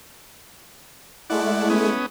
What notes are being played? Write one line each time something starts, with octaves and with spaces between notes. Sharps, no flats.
G#3 A3 E4 D5 F#5
B3 C#4 D#6